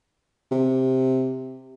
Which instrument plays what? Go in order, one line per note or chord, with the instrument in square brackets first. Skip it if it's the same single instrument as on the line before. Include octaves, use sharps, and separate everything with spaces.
[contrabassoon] C3